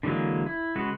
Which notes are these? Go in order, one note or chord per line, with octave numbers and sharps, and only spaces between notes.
D3 E3 F#3 G#3 A#3
E4
C#3 G#3 F#4 B4